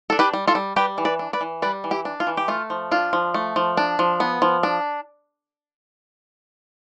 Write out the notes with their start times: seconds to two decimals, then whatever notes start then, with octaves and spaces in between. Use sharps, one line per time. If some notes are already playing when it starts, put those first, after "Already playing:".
0.10 D4 A4
0.19 G4 B4
0.33 G3
0.47 F4 A4
0.55 G3
0.76 G3 G4 B4
0.98 E3
1.05 B4 D5
1.19 D4
1.33 B4 D5
1.41 E3
1.62 G3 B4 D5
1.84 E3
1.91 E4 G4
2.05 D4
2.20 F4
2.27 E3
2.37 G4
2.48 A3 F4
2.70 F3
2.91 D4 F4
3.13 F3
3.34 A3
3.56 F3
3.77 D4
3.99 F3
4.20 B3
4.42 F3
4.63 D4